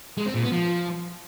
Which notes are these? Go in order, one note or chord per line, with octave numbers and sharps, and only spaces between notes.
G#3
C4
A#2
B3
F3